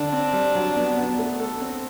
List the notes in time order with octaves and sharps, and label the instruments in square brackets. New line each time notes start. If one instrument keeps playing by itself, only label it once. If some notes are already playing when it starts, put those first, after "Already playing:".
Already playing: [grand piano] D3 [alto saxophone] D4
[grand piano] C4
G3
F#3
B3
B3
A3
A4
C4